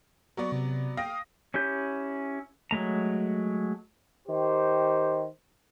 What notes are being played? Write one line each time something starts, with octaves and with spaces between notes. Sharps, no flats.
F#3 B3 D5 C#6
C3
F5 G5 D#6 A#6
C#4 E4 G4 G6
F#3 G#3 A3 A#5
D#3 G4 C5